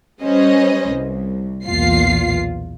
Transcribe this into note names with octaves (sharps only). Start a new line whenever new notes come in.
G3 C#4 B4 C5 D#5
C2
B1 E2 A#2 F4 C7